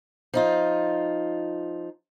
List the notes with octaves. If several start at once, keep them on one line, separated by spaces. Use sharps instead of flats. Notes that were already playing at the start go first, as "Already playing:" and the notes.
F3 D#4 F4